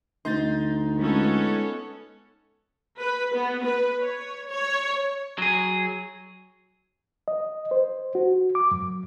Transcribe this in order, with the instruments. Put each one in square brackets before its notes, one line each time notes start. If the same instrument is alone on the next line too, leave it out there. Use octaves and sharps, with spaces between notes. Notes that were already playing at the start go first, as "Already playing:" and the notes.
[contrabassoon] D2 [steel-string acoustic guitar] D#4 [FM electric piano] C6 G6 A6
[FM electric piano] G#3 F4 [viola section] B3 C#4 A4
[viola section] B4
B3
B4
C#5
C#5
[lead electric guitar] F#3 G#4
[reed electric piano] D#5
C5
F#4
D6
F#2